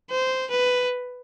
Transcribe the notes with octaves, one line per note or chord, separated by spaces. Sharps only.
C5
B4